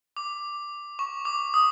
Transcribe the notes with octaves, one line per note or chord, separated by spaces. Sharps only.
D6
C#6
D6
D#6